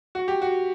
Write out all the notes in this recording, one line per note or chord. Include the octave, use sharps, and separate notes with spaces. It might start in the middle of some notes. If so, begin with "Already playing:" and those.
F#4
G4
F#4